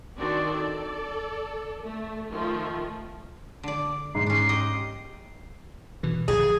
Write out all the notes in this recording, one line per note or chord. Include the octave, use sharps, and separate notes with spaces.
D#3 C4 D4 F#4 D5
A4 D5
A3
D#3 F3 A3 F4
D3 D5
G#2 C7
C#4 D4 C7
G4 D#5
B2 E3
A#1 A2 D3 G#4